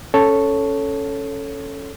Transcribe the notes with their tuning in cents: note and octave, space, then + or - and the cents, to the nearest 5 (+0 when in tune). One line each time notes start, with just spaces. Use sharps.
C#4 +0 A4 +0 C#5 +0